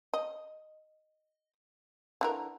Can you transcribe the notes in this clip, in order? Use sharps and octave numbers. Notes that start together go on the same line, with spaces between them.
D#5
D3 E3 A#4